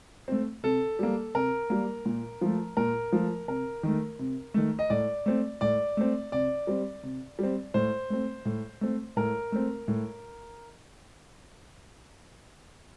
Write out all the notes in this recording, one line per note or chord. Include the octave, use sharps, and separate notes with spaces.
A3 C4
C3 A4
G3 A#3
C3 A#4
G3 A#3
A#2
F3 A3
A#2 A#4
F3 A3
C3 A#4
D#3 A3
C3
D#3 A3
D#5
A2 D5
A3 C4
A2 D5
A3 C4
C3 D5
G3 C4
C3
G3 C4
A2 C5
A3 C4
A2
A3 C4
A2 A#4
A3 C4
A2